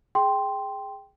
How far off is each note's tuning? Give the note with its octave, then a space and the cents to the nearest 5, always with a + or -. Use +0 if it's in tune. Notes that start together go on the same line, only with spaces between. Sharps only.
G#4 +0 G5 +0 C6 +0